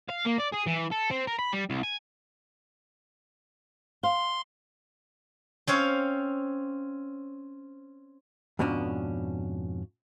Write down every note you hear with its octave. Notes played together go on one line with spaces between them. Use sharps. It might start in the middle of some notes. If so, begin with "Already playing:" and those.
F5
A#3
D5
G#4
E3
A4
C4
A#4
B5
G3
C2
G#5
F5 C6
C4 C#4 C#5 F5
F2 G#2 B2 B3 C#4 D4